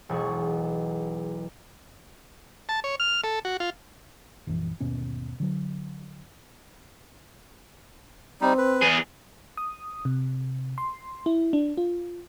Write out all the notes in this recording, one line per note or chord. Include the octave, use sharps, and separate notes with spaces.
E1 B1 G#4 C#6
A5
C#5
F6
A4
F#4
F4
A#1 F#2 E3
G1 D#2 B2 C#4
D3 F#3
G3 C4 D#4
B4
E2 G#4
D#6
C3
C6
E4
D4
F4